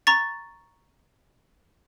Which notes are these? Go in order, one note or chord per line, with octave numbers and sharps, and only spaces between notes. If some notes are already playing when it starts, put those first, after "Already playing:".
A#5 C#6 A6